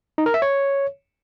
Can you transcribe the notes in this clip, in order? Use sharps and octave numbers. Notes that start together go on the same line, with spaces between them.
D#4
A#4
E5
C#5